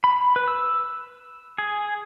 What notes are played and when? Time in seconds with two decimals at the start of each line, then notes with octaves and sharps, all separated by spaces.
0.04 B5
0.36 B4
0.48 E6
1.58 G#4